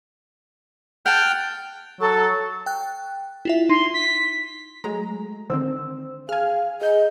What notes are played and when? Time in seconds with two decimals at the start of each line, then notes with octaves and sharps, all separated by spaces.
1.06 F#5 G5 A5 F6 G6
2.01 F#3 A4
2.66 G5 F#6
3.45 E4 F4 E5
3.69 D#4 C6
3.94 B6
4.84 F#3 G#3 A3 A#5
5.50 D3 D#3 C4 C5 E6
6.29 G#4 F5 G#5 F6
6.82 G#4 D#5 G6